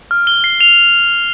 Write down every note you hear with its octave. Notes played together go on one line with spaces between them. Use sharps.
F6
G7
C7
F7